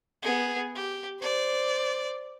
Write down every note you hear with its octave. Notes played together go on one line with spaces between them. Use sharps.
B3 G#4
G4
C5 D5